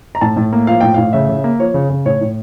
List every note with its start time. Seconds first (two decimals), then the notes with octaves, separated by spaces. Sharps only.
0.15 A#5
0.21 A2 A5
0.36 A2
0.53 A#3
0.67 F3 F5
0.81 A2 G5
0.94 A2 F5
1.13 C#3 E5
1.29 C#3
1.44 A#3
1.59 F3 C#5
1.74 C#3
1.90 C#3
2.05 A2 C#5
2.21 A2